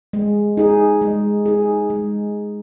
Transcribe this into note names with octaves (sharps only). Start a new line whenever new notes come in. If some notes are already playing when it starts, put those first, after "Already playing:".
G#3
D#4 G#4
G#3
D#4 G#4
G#3